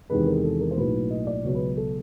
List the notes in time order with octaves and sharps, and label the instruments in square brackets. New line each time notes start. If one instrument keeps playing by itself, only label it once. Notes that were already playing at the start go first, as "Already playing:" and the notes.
[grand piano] E2 C3 D#3 G#3 B4
A#4
A4
A#4
C5
B1 A2 F#3 A#3 B4
D#5
D5
C#2 B2 F#3 C#5
B4
A4